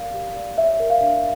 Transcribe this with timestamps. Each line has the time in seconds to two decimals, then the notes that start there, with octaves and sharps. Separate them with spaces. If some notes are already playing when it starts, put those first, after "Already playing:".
Already playing: G4 A#4 D5 F5
0.14 G4
0.36 D5
0.58 C#5 E5
0.80 A#4
0.90 F5
1.01 D4